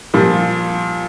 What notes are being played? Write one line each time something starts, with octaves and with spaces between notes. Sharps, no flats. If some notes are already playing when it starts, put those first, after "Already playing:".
A#2 F3 G3